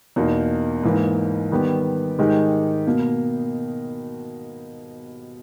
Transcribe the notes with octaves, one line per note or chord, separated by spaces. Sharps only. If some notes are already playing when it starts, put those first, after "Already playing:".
E2 B2 A#3 D#4
G#2 E3 A#3
D#3 G3 B3 G4
G#2 D#3 G#3 D#4 G4
B2 A#3